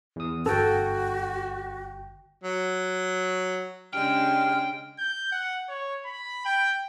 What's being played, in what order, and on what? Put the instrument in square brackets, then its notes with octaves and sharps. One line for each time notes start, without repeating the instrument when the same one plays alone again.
[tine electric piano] E2 D#6
[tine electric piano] G1 G5 [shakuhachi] F#4 [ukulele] A4
[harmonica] F#3
[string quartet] C#3 G#3 D4 [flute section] G4 F6 G6 [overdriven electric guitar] G5
[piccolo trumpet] G6
F#5
C#5
B5
G5